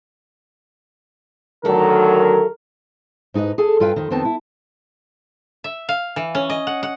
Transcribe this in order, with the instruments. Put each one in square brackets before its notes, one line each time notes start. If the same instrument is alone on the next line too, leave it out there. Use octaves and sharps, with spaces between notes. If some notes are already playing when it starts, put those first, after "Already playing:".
[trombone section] D2 D#3 F#3 [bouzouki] A3 A4 [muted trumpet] A#4
[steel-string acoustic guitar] G#2 D#4 F4 B4 D#5
G#4 A4 G#5
G2 F4 B4 F5 G5 G#5
F2 D#3
F2 D#3 B3 C4 B4 A5
E4
[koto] E5
F5
E3
C#4
D#5
F#5
F#5